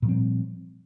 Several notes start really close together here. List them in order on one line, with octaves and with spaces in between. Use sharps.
A#2 F3 C4 G3